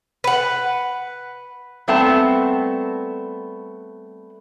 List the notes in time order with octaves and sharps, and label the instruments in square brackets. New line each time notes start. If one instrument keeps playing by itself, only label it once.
[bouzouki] B4 F#5
[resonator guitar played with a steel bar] G3 A3 B3 C4 A5